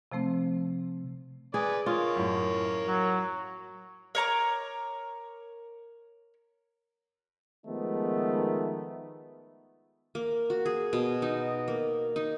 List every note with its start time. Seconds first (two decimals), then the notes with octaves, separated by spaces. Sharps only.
0.12 C3 F3 A3 C4
1.54 G#4 B4 D5
1.86 A#3 F4 C#5 C#6 D#6
2.16 F#2 A2
2.87 F#3
4.15 A#4 C#5 A#5 D6
7.66 D#3 F3 G#3 A3 B3 D#4
10.15 A#3
10.50 F#4
10.66 G#4
10.93 B2
11.22 D#4
11.68 A#3
12.16 D#4